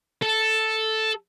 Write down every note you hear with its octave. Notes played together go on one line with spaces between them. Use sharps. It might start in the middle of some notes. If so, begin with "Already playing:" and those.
A4